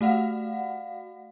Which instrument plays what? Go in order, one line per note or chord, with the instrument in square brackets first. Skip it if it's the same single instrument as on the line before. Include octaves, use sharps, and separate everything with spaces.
[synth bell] A3 F#4 F5 F#5